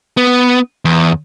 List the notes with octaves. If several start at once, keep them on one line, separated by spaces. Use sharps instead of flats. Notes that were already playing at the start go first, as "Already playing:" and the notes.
B3
E2